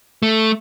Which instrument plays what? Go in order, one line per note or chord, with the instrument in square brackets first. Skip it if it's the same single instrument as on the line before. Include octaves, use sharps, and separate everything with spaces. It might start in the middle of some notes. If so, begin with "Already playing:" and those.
[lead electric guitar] A3